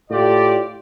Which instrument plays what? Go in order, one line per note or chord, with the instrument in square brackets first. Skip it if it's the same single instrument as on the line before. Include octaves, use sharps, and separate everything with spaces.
[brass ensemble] A2 F4 G4 D5